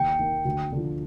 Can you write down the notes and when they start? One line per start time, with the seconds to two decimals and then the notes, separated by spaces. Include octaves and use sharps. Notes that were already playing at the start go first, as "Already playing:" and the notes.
Already playing: D#2 G5
0.19 D#3 A#3 D#4
0.45 D2
0.72 D3 F3